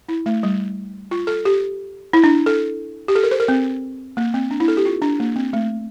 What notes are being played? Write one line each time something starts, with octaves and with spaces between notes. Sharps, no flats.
E4
A3
G3
F4
A4
G4
E4
D4
A4
G4
A4
A#4
C5
A#4
C4
A#3
C4
D4
E4
A4
G4
F4
D4
A#3
C4
A3